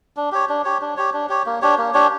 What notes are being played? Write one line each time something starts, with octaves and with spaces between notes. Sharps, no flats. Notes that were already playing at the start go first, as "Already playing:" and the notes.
D4
G4 C#5
D4
G4 C#5
D4
G4 C#5
D4
G4 C#5
A#3
D4 G4 C#5
A#3
D4 G4 C#5